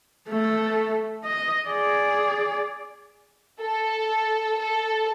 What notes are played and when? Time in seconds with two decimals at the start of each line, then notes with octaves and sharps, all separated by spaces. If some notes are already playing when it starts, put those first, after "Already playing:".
0.29 A3 A4
1.24 D#5
1.69 G#4 D5
3.62 A4
4.59 A4